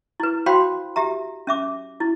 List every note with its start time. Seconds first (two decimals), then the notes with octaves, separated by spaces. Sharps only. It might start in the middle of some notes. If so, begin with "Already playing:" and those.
0.20 E4 B4
0.46 F#4 C5 F5 G5 B5 C6
0.96 G4 E5 A#5
1.47 C#4 E5 D6
2.00 E4